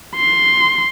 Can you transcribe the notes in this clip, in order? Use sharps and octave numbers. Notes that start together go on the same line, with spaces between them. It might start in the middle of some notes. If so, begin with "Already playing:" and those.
C6